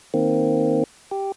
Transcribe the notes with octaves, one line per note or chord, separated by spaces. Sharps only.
D#3 A#3 C4
G4